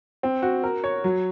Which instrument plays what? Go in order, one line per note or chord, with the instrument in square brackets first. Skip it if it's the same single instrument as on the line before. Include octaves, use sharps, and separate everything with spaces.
[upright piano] C4
F#4
A#4
C#5
F#3